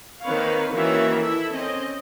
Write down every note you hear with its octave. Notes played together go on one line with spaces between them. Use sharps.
D#3 A#3 C4 B4 C#5 F5
D#3 E3 A#3 C#4 F#4 E5
E4 A4 E5
C4 C#4 D#5